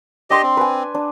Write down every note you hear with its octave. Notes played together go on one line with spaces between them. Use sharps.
D4 G4 D#5 C6 D6
C4
B4 G#5
D4